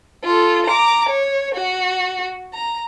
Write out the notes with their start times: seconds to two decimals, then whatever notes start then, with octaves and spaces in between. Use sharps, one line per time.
0.24 F4 A4
0.66 A#5 D6
1.09 C#5
1.54 F#4
2.53 A#5